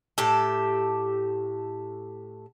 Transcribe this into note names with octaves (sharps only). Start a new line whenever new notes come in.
A2 G4 A4